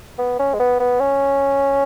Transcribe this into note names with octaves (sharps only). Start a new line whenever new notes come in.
B3
C#4
G#3
B3
B3
C#4